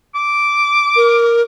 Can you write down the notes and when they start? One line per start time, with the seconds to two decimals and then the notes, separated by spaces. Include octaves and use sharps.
0.15 D6
0.96 A#4